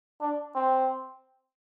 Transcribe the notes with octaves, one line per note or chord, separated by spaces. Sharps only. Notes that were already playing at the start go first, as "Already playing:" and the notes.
D4
C4